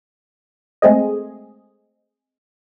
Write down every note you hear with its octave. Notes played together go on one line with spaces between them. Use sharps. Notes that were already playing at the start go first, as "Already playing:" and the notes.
G#3 A3 C4 G#4 D#5